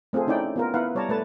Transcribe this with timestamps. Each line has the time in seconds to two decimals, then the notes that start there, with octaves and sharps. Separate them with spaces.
0.13 A3 C4 F4 G#4 A4
0.27 C#4 D#4 E4 D5 G5
0.56 B3 F4 A#4
0.74 B3 E4 B4 F5 F#5
0.95 G3 C#5 D5 A5 A#5
1.09 A3 B4 A5